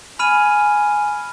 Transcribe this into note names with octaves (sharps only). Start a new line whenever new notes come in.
G#5 B5 F6 D#7